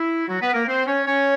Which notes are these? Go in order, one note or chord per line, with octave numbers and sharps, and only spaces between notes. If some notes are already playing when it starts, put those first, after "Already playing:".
Already playing: E4
F#3 F#4
B3 B4
A#3 A#4
C4 C5
C#4 C#5
C#4 C#5